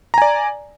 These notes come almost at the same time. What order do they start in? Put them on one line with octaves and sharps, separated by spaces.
A#5 G#5 D5